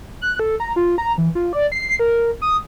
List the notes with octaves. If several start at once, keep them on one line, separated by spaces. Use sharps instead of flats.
F#6
A4
A#5
F4
A#5
E3
F4
D5
C7
A#4
D#6